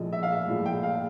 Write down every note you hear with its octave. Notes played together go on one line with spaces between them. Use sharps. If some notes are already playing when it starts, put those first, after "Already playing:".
Already playing: A#1 A2 F3 G#3 D#5
E5
F5
E5
A#1 A2 F3 G#3
G5
F5